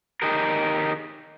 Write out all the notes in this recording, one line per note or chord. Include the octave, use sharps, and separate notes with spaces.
D#4 G4 G#4 A#4